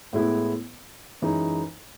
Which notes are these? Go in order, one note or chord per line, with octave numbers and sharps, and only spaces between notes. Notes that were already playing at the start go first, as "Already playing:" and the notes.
A2 G#3 B3 E4
F#2 E3 G#3 D#4